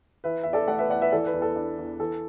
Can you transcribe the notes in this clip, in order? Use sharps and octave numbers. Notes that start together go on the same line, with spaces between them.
E3 B4 E5
E2 E5
A4 D5
A3 D5 F#5
B4 E5
E2 D5 F#5
B4 E5
E3 A4 D5
B4
E2
A4
D4
E2
E3 A4